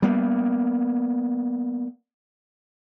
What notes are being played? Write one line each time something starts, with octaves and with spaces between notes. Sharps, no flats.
G3 A#3 B3